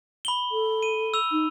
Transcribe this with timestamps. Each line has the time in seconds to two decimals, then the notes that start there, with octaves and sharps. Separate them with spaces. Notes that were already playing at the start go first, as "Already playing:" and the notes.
0.25 B5 F#7 G7
0.52 A4
0.83 D#7
1.14 E6 F7
1.32 D#4